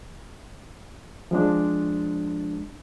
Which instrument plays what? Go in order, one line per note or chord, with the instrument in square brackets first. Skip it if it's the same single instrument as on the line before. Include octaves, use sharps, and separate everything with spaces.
[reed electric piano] F3 G#3 D4